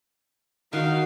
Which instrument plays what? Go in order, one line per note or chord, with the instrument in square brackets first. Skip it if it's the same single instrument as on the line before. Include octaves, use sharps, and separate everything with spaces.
[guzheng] D#3 F#5 [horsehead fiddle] D#4 F#4 [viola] F5